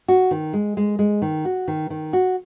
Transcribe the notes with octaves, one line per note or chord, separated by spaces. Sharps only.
F#4
D#3
G#3
G#3
G#3
D#3
F#4
D#3
D#3
F#4